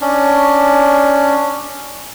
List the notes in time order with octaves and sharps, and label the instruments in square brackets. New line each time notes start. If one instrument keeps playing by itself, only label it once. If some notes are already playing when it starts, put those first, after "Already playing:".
[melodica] C#4 D4